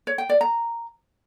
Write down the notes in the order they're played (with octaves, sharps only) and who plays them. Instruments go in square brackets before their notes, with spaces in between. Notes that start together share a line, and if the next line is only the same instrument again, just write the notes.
[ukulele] C#5
G5
D5
A#5